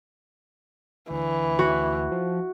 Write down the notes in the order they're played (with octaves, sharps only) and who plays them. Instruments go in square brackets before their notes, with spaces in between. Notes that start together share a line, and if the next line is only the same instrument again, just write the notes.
[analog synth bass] D2 [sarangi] E3
[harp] F#4
[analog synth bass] F3